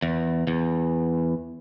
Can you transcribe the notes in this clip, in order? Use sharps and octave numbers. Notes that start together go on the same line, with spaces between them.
E2
E2